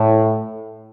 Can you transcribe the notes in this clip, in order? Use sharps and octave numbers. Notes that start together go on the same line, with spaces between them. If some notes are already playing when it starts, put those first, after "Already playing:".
Already playing: A2